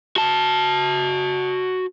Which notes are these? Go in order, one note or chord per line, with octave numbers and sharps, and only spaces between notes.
F#4 A5